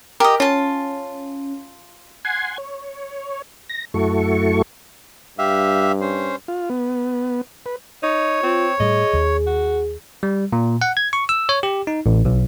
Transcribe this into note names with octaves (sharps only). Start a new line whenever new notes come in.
G4 A#4 D#5
C#4 F4 A5
F#5 G#5 C6 G#6
C#5
A#6
F#2 A3 E4 F#4 A4 C#6
G2 G4 E5 F5
C#4 C5
F4
B3
B4
D#4 C#5
C4 F4
A2 G3 G#4 D#5
D#2 D#3
F#4
G3
A#2
F#5
G#6
C#6
E6
C#5
G4
D#4
A1
B1